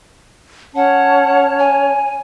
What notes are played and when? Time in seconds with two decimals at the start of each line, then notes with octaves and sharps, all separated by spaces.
0.76 C#4 C#5 F#5 A5
1.59 G#5